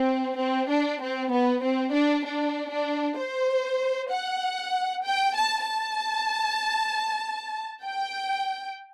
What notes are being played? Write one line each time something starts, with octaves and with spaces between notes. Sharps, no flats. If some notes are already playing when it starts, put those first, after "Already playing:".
Already playing: C4
C4
D4
C4
B3
C4
D4
D4
D4
C5
F#5
G5
A5
A5
G5